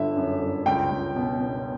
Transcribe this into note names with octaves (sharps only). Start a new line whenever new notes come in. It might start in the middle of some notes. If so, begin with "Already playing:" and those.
Already playing: G1 D3 E5
F#2
G1
C#2 G5
C#2
B2
B2